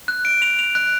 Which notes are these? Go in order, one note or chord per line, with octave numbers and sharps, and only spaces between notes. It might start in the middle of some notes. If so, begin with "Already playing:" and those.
F#6
D7
F7
F7
F#6